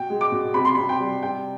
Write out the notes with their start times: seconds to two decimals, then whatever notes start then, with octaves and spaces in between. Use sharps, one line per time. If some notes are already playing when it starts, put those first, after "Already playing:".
Already playing: B2 G5
0.10 G#3
0.21 D6
0.32 B2
0.54 C3 B5
0.65 C6
0.75 C3 B5
0.89 G5
1.00 G3
1.22 C3 G5